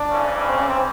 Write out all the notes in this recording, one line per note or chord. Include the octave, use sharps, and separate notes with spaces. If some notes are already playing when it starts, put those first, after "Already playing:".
Already playing: D4
F2 C#3 E3
C4
C#4
C4